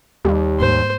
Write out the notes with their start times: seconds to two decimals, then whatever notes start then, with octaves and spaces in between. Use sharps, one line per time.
0.25 D#2 G3
0.60 G#2 A#3 C5